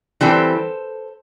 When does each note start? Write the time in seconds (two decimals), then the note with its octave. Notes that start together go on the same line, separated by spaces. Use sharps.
0.21 E3 G3 C4 A4 C5